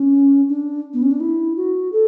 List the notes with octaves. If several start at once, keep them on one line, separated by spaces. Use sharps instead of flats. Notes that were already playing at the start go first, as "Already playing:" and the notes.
Already playing: C#4
D4
B3
C#4
D4
E4
F#4
A4